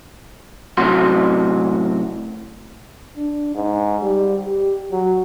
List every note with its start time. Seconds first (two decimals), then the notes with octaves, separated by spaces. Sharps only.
0.77 A2 C3 F#3 F#4 C6
3.17 D4
3.55 G#2
4.02 G3
4.44 G4
4.92 F#3